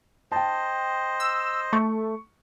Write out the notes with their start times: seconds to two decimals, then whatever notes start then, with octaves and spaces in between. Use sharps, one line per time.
0.32 C5 D#5 G5 A5
1.20 E6
1.73 A3 C#6